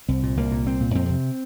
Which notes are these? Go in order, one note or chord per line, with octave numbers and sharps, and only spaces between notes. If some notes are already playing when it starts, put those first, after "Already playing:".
C2 C4
A#2
C2 A#3
A#2
C2 C4
A#2
F2 C4
C3